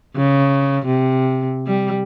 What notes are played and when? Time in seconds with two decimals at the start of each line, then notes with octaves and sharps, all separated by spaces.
0.16 C#3
0.86 C3
1.67 G3